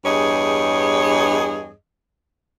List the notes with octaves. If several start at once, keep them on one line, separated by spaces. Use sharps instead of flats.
E2 G2 G#4 C#5 D#5